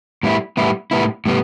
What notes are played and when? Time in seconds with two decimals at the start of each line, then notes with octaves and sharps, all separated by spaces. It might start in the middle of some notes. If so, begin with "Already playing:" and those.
0.23 A2 G3 B3 E4
0.57 A2 G3 B3 E4
0.91 A2 G3 B3 E4
1.26 A2 G3 B3